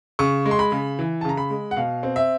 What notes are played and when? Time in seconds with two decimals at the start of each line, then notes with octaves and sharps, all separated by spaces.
0.19 C#3 C#6
0.46 G#3
0.51 C6
0.59 B5
0.72 C#3
0.99 E3
1.21 A5
1.25 C#3 A#5
1.37 B5
1.50 G#3
1.71 F#5
1.77 B2 F5
2.03 C4
2.16 E5